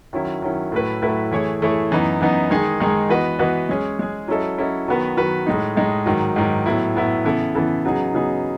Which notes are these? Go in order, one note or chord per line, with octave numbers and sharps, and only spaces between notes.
D#3 F#3 C#4 E4
D#3 F#3 C#4 E4
A2 F#3 A3 E4 B4
A2 F#3 A3 E4 B4
E3 A3 E4 G#4 C#5
E3 A3 E4 G#4 C#5
F#2 E3 B3 D#4
F#2 E3 B3 D#4
D#3 G#3 D#4 G#4
D#3 G#3 D#4 G#4
E3 B3 F#4 B4 D#5
E3 B3 F#4 B4 D#5
G#3 C#4 G#4
G#3 C#4 G#4
F#3 C#4 E4 A4 D#5
F#3 C#4 E4 A4 D#5
D#3 F#3 B3 F#4 B4
D#3 F#3 B3 F#4 B4
A2 G#3 D#4
A2 G#3 D#4
G#2 D#3 F#3
G#2 D#3 F#3
A2 F#3 B3 E4
A2 F#3 B3 E4
C#3 E3 B3 E4 A4
C#3 E3 B3 E4 A4
C#3 F#3 B3 D#4 G#4
C#3 F#3 B3 D#4 G#4